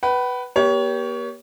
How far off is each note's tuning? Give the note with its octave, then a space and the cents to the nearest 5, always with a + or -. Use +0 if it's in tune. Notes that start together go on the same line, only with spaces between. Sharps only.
B4 +0 F#5 +45
A#3 +45 G4 +0 C#5 +25